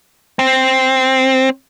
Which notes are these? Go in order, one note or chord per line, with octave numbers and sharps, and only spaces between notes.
C4